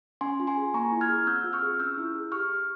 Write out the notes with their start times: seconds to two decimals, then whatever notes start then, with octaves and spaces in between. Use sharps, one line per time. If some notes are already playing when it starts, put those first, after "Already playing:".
0.21 C#4 G#5 C6
0.40 F4
0.47 G#5 C6
0.57 G#4
0.74 A#3 A#5 C#6
0.92 E4
1.01 F6 G#6
1.09 G#4
1.27 C4 E6 G6
1.44 F4
1.53 C#6 F6
1.63 G#4
1.80 C#4 E6 G6
1.98 E4
2.15 G#4
2.32 G4 C#6 F6
2.49 G4